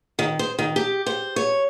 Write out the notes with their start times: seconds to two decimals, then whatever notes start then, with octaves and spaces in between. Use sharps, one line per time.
0.19 D#3
0.39 C5
0.59 D#3
0.76 G4
1.06 C5
1.36 C#5